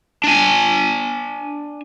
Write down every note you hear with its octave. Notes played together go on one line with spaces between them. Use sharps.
D4 G#5